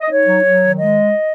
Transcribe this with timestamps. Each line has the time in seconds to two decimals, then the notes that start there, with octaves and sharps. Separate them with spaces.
0.01 D#5
0.10 D#4 C#5
0.26 F#3
0.43 F#3
0.60 D#3
0.77 G#3 D#5